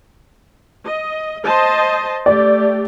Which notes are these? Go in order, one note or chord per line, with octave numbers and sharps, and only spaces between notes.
D#5
C5 D#5 A5
A3 G4 D5